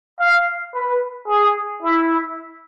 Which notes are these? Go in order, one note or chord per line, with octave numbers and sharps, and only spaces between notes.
F5
B4
G#4
E4